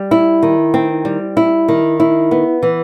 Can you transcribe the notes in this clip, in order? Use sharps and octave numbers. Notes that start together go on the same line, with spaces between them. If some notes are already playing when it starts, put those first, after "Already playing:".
Already playing: G3
E4
D#3
C4
G3
E4
D#3
E4
B3
E3